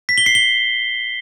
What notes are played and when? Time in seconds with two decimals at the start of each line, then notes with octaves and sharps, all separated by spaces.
0.09 B6
0.18 G7
0.26 C7
0.35 G7